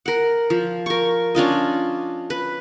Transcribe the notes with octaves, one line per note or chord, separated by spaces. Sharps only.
A#4 F#5
F3
A#4 C#6
C#4 D4 F4 D#5
B4